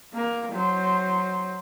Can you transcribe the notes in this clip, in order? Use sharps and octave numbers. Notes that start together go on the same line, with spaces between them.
A#3 A#4
F#3 C5